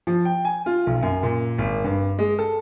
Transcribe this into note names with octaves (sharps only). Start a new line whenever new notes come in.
F3
G5
G#5
F4
B1
F#2
A#2
G#1
G2
G#3
A4